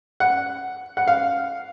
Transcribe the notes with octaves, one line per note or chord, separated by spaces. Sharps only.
F#5
F#5
F5